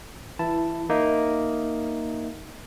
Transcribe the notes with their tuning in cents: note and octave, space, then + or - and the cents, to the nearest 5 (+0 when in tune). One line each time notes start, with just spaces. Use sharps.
E3 +0 E4 +15 A5 +0
A#3 +0 D#4 +0 E5 +0